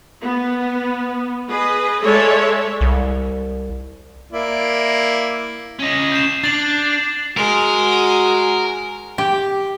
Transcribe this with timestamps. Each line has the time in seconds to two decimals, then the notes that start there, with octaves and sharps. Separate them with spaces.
0.22 B3
1.49 G#4 B4 D#5
2.03 G#3 A4 C#5 D5 E5
2.81 C2
4.33 A#3 E4 D5
5.79 C#4 D#5
6.12 G6 C7 E7
6.44 D4 A6 F7 F#7
7.37 G#3 F#4 A#4
9.18 G4